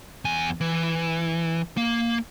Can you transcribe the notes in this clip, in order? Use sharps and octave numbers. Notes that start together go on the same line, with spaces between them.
E2 G#5
E3
A#3